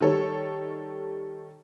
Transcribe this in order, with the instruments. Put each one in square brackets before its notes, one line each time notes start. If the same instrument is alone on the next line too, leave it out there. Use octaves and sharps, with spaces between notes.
[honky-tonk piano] D#3 G3 A4 C#5